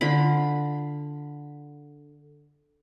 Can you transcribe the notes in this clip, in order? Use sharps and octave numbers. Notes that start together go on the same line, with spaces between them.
D3 F4 B5